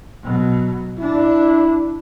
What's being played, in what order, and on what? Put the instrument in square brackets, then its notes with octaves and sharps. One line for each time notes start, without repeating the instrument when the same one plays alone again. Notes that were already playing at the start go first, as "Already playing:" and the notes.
[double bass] B2 F#3
[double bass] D4 [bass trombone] E4